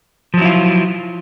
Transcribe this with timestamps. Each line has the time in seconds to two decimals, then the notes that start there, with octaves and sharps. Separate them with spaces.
0.34 F3
0.38 F#3
0.42 E4
0.45 F4